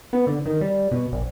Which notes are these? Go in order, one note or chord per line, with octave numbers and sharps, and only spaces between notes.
B3
D3
D#3
G3
B2
A#1